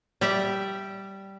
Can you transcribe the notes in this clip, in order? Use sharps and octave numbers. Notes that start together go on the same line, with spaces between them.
G3 G4 E5